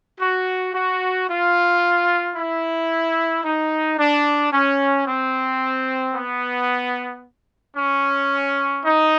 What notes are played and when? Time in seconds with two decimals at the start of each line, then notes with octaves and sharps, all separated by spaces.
0.20 F#4
0.74 F#4
1.28 F4
2.36 E4
3.45 D#4
3.99 D4
4.53 C#4
5.07 C4
6.14 B3
7.77 C#4
8.85 D#4